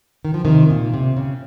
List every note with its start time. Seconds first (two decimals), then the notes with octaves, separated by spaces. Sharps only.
0.25 D#3
0.34 F3
0.45 C3 D#3
0.70 A#2
0.94 C3
1.17 C#3